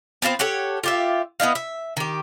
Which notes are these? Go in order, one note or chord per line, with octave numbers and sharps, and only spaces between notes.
B3 C4 F4 C5
G4 A4 C#5 F#5
F4 G4 E5
B3 E4 D#5 F5
E5
D#3 G4